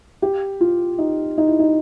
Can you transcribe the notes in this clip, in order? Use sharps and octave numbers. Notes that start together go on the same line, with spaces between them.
G4
F4
D#4
D#4
E4
D#4